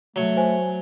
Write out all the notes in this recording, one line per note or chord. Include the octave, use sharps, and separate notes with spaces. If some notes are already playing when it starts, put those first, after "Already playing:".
F#3 A3 C#5
C5 G#5